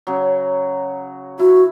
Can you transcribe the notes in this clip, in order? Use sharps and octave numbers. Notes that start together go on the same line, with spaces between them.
C#3 F#3
E4 F#4